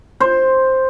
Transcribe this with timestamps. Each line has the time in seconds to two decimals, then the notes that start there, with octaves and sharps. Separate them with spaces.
0.20 C5